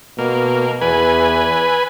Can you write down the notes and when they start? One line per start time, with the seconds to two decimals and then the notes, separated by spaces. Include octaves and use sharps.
0.18 B2 A#3
0.81 E2 B4 G#5